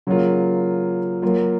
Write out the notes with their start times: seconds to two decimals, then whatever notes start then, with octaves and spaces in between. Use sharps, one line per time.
0.07 C#3 F#3 A#3 F4
1.22 F#3 A#3 F4